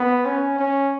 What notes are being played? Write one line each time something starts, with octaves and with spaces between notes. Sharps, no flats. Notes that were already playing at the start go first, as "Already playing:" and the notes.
Already playing: B3
C#4
C#4